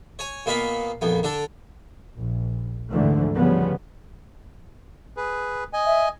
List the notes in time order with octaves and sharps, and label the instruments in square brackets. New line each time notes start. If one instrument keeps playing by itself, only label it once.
[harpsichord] C#5 G#5
A#2 A#3 B3 D#5 F5 B5
A#1 F2 B3
D3 D4 A4
[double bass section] A#1
D2 G#2 D3 E3 F3 A3
C#3 F3 G3 B3
[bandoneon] G#4 B4
D#5 G#5
[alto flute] E5